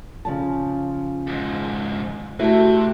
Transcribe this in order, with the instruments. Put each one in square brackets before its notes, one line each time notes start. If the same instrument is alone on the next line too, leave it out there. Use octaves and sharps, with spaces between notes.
[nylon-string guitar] C#3 F3 A5
[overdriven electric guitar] F2 G#2
[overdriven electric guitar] C3 [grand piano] A3 [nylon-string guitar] E4 [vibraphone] F#4 A5